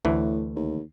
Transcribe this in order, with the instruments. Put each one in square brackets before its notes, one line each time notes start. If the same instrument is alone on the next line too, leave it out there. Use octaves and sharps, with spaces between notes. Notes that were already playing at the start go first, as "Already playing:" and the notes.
[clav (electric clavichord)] D2 E3 [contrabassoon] A2 [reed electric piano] A3
[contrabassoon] D#2